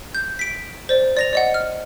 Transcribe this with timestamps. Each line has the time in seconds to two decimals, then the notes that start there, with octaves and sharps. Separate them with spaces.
0.15 G6
0.39 B6 D7
0.89 C5 D5
1.17 D5 A#6 F7
1.33 D5 D#5 F#5
1.54 F6